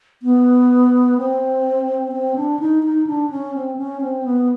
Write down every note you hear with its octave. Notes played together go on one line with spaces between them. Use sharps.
B3
C4
C4
D4
D#4
D#4
D4
C#4
C4
C#4
C4
B3